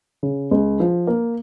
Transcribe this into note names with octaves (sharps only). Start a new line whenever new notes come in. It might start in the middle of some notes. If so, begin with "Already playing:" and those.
C#3
C#2
F3
A#3